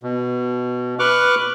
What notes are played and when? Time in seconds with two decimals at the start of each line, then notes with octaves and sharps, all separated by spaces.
0.03 B2
0.99 B4 C#6 D6 F6 F#6